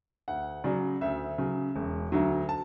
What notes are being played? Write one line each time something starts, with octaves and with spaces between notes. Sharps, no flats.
D2 F#5
C#3 F#3 D5
D2 E5
C#3 F#3
E1
D2 D3 F#3
A5